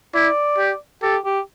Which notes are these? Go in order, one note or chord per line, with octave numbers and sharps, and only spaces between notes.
E4 D5
G4
G4 A4
G4